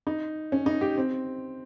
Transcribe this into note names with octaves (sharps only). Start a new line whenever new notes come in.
D#4
C#4
D#4
G4
C4